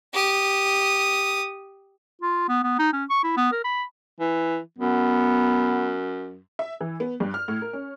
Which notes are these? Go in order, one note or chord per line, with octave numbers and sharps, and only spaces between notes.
G4 D#6
F4
B3
B3
D#4
C#4
C#6
E4
B3
A#4
B5
E3
F#2 B3
E5
E3
B3
G2
F6
A2
A#4
C#4